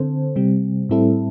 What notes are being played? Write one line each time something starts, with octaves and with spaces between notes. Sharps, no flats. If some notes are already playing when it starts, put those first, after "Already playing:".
Already playing: D3 C4 A4 C5
C3 G3 C4
A2 G3 C4 E4 A4